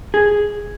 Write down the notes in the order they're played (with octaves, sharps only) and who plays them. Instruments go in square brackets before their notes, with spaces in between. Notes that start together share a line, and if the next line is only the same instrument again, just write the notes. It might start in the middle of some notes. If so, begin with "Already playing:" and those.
[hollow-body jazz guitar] G#4